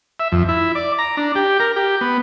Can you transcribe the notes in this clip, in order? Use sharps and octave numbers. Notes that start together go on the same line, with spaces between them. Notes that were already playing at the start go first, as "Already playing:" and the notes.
E5
F2
E4
D5
A#5
D4
G4
A#4
G4
B3